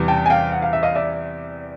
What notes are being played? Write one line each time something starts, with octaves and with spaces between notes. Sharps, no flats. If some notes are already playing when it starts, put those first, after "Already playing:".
Already playing: E2 C3 E3 G3
G5 A5
G#5
F5 G5
F#5
F5
E5
D#5 F5
D5 E5